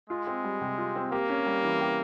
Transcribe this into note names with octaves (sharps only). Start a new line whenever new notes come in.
G#3 F4
C4
G3
C3
F4
C4
A#3 G4
C#4
G3
E3
G4